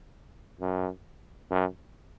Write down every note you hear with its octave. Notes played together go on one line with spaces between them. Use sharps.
F#2
F#2